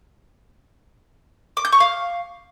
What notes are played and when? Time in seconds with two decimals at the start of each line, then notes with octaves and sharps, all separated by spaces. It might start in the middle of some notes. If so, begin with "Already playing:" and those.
1.57 D6
1.65 G6
1.72 C#6
1.80 F5